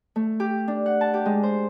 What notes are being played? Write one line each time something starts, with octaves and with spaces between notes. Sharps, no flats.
A3
G4
D4
F#5
A5
G4
G#3
C5